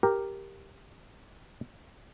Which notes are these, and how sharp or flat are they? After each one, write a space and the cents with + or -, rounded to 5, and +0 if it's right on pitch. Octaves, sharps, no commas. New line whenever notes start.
G4 +0 A#4 +0